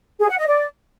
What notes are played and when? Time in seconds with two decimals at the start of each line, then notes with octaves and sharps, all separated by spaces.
0.20 G#4
0.29 F#5
0.38 D#5
0.47 D5